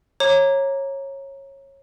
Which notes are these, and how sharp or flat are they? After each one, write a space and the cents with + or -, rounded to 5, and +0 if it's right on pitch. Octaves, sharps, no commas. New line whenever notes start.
C#5 -20 A#5 +0 D6 +0